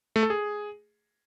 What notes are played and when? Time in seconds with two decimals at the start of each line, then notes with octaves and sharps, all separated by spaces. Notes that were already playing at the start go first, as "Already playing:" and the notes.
0.16 A3
0.23 A4
0.30 G#4